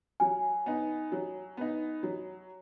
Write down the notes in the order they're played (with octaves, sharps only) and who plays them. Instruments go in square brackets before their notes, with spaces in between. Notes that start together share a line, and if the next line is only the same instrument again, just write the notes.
[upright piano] F#3 [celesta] G#5
[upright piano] B3 D#4
F#3
B3 D#4
F#3